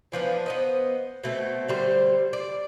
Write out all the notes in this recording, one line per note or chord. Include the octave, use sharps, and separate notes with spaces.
E3 F3 B3 D4
B3 C5 D#5
B2 A3 C4
D3 G3 C5
D5